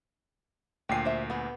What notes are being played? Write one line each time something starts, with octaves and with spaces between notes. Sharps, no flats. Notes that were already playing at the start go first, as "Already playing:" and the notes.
D2 A#2 G5 G#5 C7
C5 E5
B3 G#4